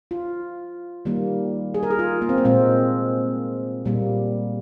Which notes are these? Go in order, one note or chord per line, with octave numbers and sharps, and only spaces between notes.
F4
D#3 G3 A#3
G#4
A#4
G#4
F4
A#3
C4
A#3
A#2 G#3 C4
A#2 G3 A#3